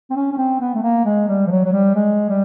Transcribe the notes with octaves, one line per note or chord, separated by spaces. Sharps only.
C4
C#4
C#4
C4
B3
A3
A#3
G#3
G3
F3
F#3
F#3
G3
G#3
G3